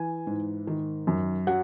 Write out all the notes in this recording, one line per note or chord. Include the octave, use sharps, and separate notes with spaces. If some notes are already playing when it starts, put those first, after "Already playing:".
Already playing: E3 G#5
G#2
D#3
F#2
F#3 F#5